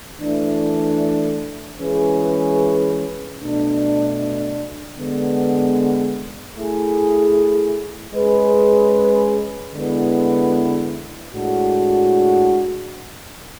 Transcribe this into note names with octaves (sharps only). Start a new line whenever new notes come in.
E3 A3 D4
E3 G#3 C#4 G#4 B4
B2 A3 D4
D3 G#3 B3
A3 E4 G#4
G#3 C#4 G#4 B4
D3 G#3 B3 E4 B4
A2 G#3 D4 F#4